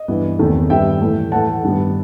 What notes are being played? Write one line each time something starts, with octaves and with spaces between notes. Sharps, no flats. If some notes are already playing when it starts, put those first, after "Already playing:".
Already playing: D#5
G2 E3 B3
E2 C3 D#3 A3
G2 D#3 G3 B3 E5 G5
A2 E3 A3
A2 E3 A3 F#5 A5
G2 D#3 G3 B3